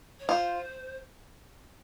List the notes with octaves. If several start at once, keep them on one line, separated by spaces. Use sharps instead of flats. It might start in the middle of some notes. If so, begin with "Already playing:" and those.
C#5
F4 C5